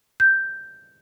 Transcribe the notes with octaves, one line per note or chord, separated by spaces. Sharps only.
G6